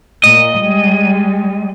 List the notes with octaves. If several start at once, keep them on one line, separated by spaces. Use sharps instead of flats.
A#2 D#5
G3 G#3